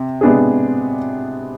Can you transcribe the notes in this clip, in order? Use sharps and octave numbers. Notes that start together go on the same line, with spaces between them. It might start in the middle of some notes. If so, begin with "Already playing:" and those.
Already playing: C3
C3 G#3 B3 D4 G#4